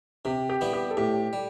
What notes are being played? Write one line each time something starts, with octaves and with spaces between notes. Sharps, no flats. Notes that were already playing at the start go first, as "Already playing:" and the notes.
C3 G4
G4
G3 B3 E4
G4
A4
A2 G4
G3